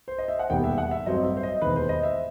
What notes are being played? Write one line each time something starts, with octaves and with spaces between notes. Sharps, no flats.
C5
D#5
E5
F#5
E1 D#2 D#3 G3 B3 G5
E5
F#5
E5
A1 G2 F#3 A3 C4 D#5
E5
C5
D#5
E1 D#2 D#3 B4
C5
D#5
E5